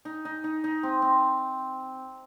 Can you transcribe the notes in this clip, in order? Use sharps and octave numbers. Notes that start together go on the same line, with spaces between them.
D#4
D#4
D#4
D#4
C4
C4